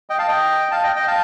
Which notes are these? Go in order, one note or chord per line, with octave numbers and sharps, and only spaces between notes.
D#5 G5
F5 A5
D#5 G5
F5 A5
D#5 G5
D#5 G5
F5 A5